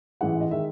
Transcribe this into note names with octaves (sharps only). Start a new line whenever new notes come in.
A1 G#2 E3 G#3 F#5
D#5
D#3 G#3 E5